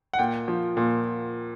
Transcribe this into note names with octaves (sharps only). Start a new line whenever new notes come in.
F#5
A#2 G5
F3
A#2